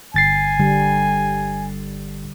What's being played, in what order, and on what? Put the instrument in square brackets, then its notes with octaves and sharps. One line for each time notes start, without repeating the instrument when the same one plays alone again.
[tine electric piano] G1 A6 C7 [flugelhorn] G#5
[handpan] D3 G3